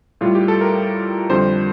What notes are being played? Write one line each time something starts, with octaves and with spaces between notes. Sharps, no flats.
A2 G3 F4
G4
A4
A#4
F2 D3 G3 C5